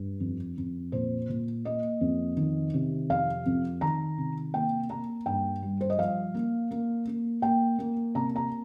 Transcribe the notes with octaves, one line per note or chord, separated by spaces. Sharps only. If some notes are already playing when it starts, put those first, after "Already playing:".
Already playing: G2
F2
F2
A#2 C5
A#2
A#3 D#5
F2
D#3
C3
F2 F5
F2
D#3 A#5
C3
A#3 G5
A#3 A#5
G2 G5
G3
C5
D#5
F3 F5
A#3
A#3
A#3
A#3 G5
A#3
C3 A#5
A#5